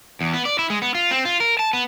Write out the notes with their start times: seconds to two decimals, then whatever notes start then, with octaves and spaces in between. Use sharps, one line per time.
0.21 E2
0.34 B3
0.45 D5
0.59 E4
0.70 G#3
0.82 B3
0.95 F4
1.11 C4
1.25 F4
1.40 A#4
1.59 A5
1.73 B3